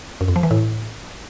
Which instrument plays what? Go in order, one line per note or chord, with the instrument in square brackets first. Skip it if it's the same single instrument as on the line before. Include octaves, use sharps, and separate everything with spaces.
[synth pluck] F#2
F2
F3
E3
A2